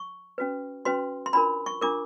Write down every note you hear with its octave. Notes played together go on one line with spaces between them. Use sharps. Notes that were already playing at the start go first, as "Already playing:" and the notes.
Already playing: C#6
C#4 F#4 B4
C#4 F#4 B4 C6
C6
D4 F4 A#4 B5
C#6
D4 F4 A#4 D6